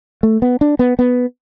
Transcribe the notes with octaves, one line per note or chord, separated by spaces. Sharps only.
A3
B3
D4
B3
B3